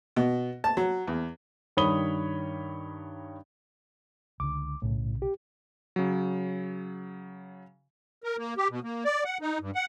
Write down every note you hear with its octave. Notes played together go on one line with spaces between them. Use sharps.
B2
A5
F#3
E2
G2 D#3 C#5 B5 D#6 G7
C#2 D3 D6
B1 A2 C#3
G4
C#3 F#3
A#4
A#3
G4
B2
A#3
D5
F#5
D#4
G2
F#5